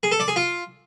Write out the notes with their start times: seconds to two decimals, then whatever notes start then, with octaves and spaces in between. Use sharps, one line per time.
0.03 G#4
0.12 A4
0.20 D5
0.28 G#4
0.36 F4